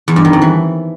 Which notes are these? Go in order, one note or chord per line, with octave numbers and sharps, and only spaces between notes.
E2
G2
D#3
F2
E3